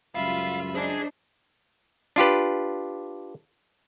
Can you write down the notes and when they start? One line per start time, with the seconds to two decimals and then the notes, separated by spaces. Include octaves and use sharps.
0.15 C#2 F#2 G3 F4 E5 F5 B5
0.75 D4 D#4 G#4 C5 G#5
2.16 D4 F4 G4 B4